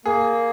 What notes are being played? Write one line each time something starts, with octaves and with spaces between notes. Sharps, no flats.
A#3 G#4